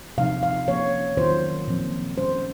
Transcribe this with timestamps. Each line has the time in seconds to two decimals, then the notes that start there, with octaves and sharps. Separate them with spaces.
0.18 C3 F3 C4 D#4 F5
0.43 F5
0.68 F3 A#3 C#4 C#5
1.17 D#3 F#3 C#4 F4 C5
1.67 A#2 F3 C4
2.18 A#2 G#3 C#4 C5